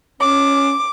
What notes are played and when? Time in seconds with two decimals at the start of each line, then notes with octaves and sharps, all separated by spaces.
0.21 C#4 D6